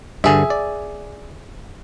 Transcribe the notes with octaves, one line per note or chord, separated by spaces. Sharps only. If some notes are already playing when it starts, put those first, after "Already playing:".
G2 D3 G#4 E5
D5